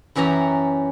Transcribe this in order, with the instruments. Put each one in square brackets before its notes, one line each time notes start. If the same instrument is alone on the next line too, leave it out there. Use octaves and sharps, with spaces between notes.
[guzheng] F#2 E3 C#4 G4 A#5